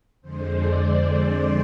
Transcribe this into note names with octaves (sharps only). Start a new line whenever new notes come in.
F2 D3 G#3 C5
D5